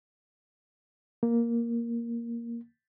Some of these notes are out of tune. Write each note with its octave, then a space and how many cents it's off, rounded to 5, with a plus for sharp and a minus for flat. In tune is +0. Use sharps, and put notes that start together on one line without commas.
A#3 +5